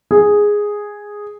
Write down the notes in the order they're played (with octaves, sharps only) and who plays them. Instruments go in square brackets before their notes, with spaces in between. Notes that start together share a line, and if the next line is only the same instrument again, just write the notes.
[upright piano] G#4